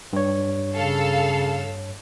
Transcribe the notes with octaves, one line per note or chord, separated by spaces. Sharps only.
G2 C#5
C#3 A4 F5 E6